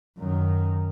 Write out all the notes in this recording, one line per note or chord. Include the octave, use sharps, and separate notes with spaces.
F#2 D#3